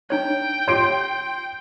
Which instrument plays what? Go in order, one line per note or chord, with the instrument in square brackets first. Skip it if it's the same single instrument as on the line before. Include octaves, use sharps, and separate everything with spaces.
[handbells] D4 D#4 C#5 [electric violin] G5
[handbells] F4 G4 C#5 [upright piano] C6 D7